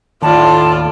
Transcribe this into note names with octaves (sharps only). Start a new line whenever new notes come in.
D#2 A2 F4 D5 A5